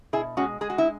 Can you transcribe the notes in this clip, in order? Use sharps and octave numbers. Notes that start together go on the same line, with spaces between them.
B2 E4 G#4
G#3 C#4 F#4
G#3 G#4
F#4
E4